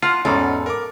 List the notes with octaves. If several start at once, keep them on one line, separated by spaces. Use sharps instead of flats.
F4 F#5 A5 C6 F6
E2 G#2 B2 C#4 A4
A#4 D6